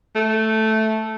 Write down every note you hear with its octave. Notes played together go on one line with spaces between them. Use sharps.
A3